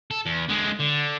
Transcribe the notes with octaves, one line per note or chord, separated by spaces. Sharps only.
A4
E2
D3 G#3
D3